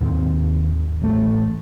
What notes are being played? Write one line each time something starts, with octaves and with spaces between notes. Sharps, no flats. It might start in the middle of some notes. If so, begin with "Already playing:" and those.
D#2 G#2 B3 C4
A1 A3